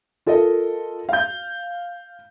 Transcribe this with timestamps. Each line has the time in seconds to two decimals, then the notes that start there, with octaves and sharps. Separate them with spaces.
0.26 F4 A4 A#4 D#5
1.09 F5 G6